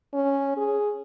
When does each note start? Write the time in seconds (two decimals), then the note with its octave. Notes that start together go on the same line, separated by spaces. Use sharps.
0.13 C#4
0.57 G#4